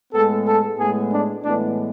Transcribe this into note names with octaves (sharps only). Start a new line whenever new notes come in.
A2 G#3 B3 A4
A4
A2 G#3 B3 G#4
D4
A2 E3 G#3 B3 D4